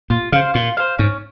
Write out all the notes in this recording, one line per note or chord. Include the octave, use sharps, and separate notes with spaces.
A#2 F4
C#3 C5 F5
A#2 F4
C5 F5
G#2 C#4